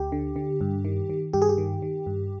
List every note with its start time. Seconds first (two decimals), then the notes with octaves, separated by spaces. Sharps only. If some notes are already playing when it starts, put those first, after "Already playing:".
Already playing: D2 G4
0.12 D3
0.36 D3
0.61 G2
0.85 D#3
1.10 D#3
1.33 G2 G4
1.42 G#4
1.49 G4
1.58 D#3
1.82 D#3
2.06 G2